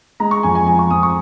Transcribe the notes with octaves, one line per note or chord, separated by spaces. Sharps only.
G#3 A#5
C#6
F2 G#5
G#5
F3 G#5
C#6
F2 D#6
C#6